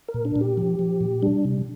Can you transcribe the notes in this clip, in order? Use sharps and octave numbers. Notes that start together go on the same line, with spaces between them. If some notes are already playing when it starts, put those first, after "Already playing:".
A#4
A#2
D4
A#2
G4
F3
F3
A#2
G3 D4
C3